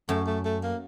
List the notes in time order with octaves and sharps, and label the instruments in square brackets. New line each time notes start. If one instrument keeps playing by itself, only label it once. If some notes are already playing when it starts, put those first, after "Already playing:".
[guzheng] F#2 [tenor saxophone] A3
[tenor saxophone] A3
A3
A#3